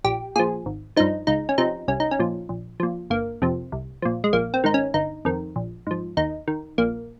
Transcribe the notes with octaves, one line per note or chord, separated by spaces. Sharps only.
A#1 G4
A#2 F3 G#4
G#1
G2 F3 D#4
C#2 D#4
C#4
C3 F3 D#4
C2 C#4
D#4
C#4
A#2 F3
A#1
A#2 F3
G1 A#3
F2 C3 F3
C2
A#2 F3
G#3
A#1 A#3
C4
G#2 D#3 D#4
C#4
G1 D#4
F2 D#3
A#1
G#2 F3
D#2 D#4
D#3
A#1 A#3